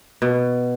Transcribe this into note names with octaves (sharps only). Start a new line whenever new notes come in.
B2